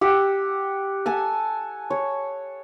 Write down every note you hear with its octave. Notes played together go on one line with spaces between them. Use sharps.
G4 F#5 E6
A4 F#5 G#5 A5
C#5